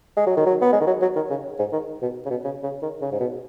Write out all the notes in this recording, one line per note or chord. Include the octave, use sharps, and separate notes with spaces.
G#3
F#3
D#3
F#3
B3
G#3
D#3
F#3
F#3
D#3
C#3
G#2
D#3
B2
C#3
B2
C#3
C#3
D#3
C#3
G#2
B2